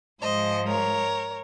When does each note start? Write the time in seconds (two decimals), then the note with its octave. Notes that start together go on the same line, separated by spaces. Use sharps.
0.20 G#2 F3 G#3 C5 D#5
0.67 A#4 C#5